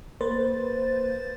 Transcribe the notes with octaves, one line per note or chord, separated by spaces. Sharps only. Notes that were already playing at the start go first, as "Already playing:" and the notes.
A#3 B4 C5 A6